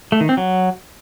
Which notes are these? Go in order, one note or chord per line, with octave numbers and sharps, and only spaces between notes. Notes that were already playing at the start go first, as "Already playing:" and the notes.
A3
D#3
C4
F#3